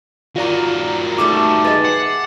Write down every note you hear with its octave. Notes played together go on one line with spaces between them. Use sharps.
D#3 F4 F#4 D5 A#5
G3 A3 A4 D6
G#4 B4 D#5 G#5 A6
F#5 C7